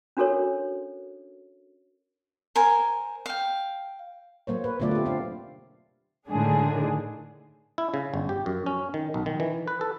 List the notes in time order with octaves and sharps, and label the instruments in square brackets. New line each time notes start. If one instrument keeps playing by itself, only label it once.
[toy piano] C#4 D4 F#4 A4 A#4 C#5
[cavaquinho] A#4 C5 G#5
F5 G5
[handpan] F#3 A#3 C5 C#5
B4
B2 D3 F#3 A3 F4 D5
F4 G4
C4 F5
[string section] A2 D3 D#3 G#3 D4 G#4
[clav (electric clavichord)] E4
C#3
G1
G4
F#2
C#4
D#3
B1
D#3
E3
B4
A4